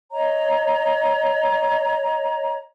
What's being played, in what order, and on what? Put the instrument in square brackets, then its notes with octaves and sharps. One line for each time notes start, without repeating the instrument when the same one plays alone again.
[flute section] C#5 D#5 A#5